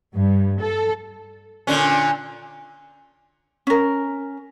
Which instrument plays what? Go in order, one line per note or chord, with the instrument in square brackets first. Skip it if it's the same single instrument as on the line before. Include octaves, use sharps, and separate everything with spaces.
[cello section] G2
A4
[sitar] A#2 D3 C#4
[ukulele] C#4 A#4